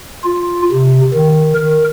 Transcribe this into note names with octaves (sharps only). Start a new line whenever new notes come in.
F4
C3
D#3
A#4